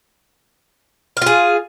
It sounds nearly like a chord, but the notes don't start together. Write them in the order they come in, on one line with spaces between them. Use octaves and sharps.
F5 F4 G#4